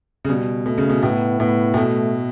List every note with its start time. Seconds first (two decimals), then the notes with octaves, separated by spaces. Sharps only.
0.25 C#3
0.28 B2 G3
0.66 B2 A3
0.78 C#3
0.90 B2
1.03 A2 B3
1.40 A2 B3
1.74 A2
1.77 B2 A3